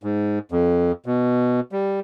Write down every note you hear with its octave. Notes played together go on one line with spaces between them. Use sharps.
G#2
F2
B2
G3